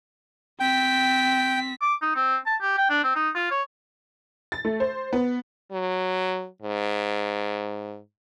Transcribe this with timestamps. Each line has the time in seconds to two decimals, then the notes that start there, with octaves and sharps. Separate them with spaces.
0.60 C4 G5 B6
1.81 D6
2.02 D#4
2.16 C4
2.46 A5
2.62 G4
2.78 G5
2.90 D4
3.04 C4
3.16 D#4
3.35 F4
3.51 C#5
4.52 A6
4.65 A3
4.80 C5
5.13 B3
5.72 F#3
6.62 G#2